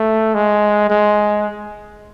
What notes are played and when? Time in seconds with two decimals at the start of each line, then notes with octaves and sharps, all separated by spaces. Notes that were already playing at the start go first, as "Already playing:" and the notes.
Already playing: A3
0.34 G#3
0.90 G#3